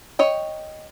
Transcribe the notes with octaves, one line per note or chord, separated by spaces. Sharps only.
C#5 D#5 G5